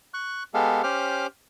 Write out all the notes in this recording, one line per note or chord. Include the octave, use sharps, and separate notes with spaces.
C#6 F#6
G#3 B3 G4 A4 F5
C#4 G4 C5 D6 F6